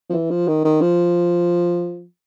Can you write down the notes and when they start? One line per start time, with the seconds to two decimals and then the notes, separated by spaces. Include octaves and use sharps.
0.10 F3
0.13 E3
0.31 F3
0.48 D#3
0.65 D#3
0.82 F3